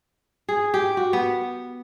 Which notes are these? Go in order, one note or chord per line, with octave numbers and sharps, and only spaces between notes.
G#4
G4
F#4
B3